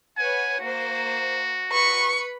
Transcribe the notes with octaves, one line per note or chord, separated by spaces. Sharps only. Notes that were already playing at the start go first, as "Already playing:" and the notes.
B4 C#5 F#5 G#5
A#3 F#4 C5
B4 B5 C#6 C#7